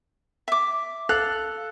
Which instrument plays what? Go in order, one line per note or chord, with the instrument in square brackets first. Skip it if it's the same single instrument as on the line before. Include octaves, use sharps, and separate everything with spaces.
[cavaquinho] E5 D6
[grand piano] A4 A5 F#6 [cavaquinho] F5